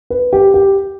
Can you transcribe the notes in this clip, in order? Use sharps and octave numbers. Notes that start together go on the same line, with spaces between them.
B4
G4
G4